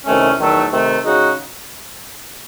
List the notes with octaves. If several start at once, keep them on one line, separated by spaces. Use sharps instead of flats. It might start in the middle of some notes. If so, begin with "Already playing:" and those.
C2 C3 D#3 A3 C#4
E2 D#3 F#3 A3
C3 D#3 A3
C#3 G#3 D#4 F#4